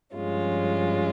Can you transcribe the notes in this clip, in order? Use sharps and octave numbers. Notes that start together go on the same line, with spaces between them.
G2 F3 G#3 C#4 F4